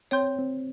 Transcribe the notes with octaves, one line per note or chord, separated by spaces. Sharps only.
C4 C#5 G5 C6 G6
C4